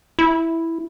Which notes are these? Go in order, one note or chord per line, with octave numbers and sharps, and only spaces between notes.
E4